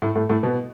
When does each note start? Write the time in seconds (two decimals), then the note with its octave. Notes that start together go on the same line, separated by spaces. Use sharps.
0.02 A2 A3
0.15 A2 A3
0.29 A2 A3
0.43 B2 B3